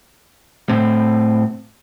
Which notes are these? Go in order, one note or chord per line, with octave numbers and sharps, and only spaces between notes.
A2 C4